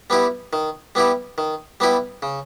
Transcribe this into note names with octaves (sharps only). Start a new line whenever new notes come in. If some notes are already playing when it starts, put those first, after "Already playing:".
G3 B3 E4 G4
D#3
G3 B3 E4 G4
D#3
G3 B3 E4 G4
C#3